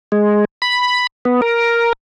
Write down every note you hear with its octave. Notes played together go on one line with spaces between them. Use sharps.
G#3
B5
B3
A#4